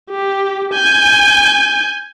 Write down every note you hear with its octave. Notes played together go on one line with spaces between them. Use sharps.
G4
G#5 G6